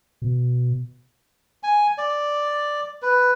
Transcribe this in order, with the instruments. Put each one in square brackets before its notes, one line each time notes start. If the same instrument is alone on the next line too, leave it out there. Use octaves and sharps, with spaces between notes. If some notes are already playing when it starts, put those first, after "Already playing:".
[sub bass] B2
[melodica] G#5
D5
B4